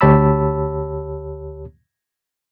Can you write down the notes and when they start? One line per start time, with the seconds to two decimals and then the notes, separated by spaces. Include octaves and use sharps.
0.01 D2 G4 C#5 A5 B5 E6